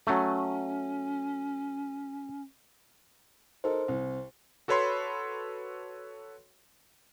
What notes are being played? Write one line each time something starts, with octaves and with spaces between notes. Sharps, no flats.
F#3 A3 C#4
D#4 A4 A#4 C5
C2
F#4 A4 B4 C#5 B5 C6